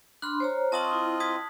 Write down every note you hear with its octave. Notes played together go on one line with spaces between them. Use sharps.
D4 B5 C6 F6 F#6
C5 C#5 A#5
C4 F4 D#5 A5 C#6 D#6 F#7
E4
D#6 G#6 B6